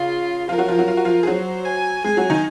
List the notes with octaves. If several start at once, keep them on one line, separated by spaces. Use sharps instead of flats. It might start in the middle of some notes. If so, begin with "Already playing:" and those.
Already playing: C#3 F4
F3 F4 A#4
F#3 F#4
F3 F4
F#3 F#4
F4
F#4
F3 F4
G#4
F#3 F#4 C5
G#5
G#3 G#4 G#5
F#3 F#4
D#3 D#4